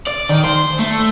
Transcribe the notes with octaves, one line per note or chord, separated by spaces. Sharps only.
D5
D#3
C5
A3